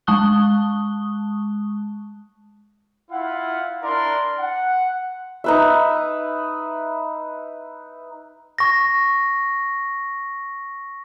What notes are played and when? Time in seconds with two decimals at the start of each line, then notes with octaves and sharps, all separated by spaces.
0.07 G#3 A5 C#6 D#6 F#6 G7
3.10 E4 F4 F5 F#5
3.82 D4 E4 A#4 D5 C6
4.39 F#5
5.44 D#4 B4 E5
8.58 C#6 A#6